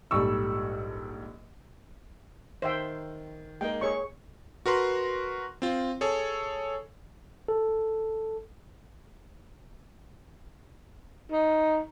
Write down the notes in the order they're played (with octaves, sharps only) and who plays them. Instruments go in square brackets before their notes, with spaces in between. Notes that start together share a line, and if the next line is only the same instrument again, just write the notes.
[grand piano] A#1 G#2 G3 A4 C#6 E6
[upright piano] D#3 [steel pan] C5 E5 G5
[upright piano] G#3 A#3 D#4 [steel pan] G5
[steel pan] G#4 C#5 C#6
[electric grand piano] F#4 A#4 B4 C6
C4 F4
G#4 A4 C#5
[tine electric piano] A4
[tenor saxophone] D#4